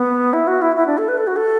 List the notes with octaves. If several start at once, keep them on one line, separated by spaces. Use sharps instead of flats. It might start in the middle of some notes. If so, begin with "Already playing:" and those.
Already playing: B3
E4
F#4
E4
E4
D4
A4
B4
A4
F#4
A4